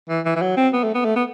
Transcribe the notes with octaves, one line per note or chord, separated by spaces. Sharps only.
E3
E3
E3
F#3
C4
B3
A3
B3
A3
B3